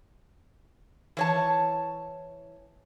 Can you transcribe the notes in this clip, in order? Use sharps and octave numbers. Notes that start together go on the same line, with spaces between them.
E3 C#5 A5